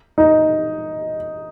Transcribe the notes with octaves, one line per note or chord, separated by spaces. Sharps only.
D#4